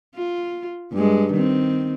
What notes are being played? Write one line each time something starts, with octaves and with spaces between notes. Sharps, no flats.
F4
G2 G#3
D#3 C4